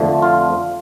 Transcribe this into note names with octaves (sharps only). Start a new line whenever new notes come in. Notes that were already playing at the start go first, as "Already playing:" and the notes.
Already playing: F2 D3 F3 A3
F4